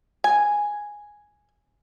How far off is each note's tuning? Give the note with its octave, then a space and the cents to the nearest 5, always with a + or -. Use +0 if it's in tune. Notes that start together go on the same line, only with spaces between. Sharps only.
G#5 +0